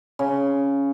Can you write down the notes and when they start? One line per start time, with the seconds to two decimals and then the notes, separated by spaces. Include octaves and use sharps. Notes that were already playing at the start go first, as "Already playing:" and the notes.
0.19 C#3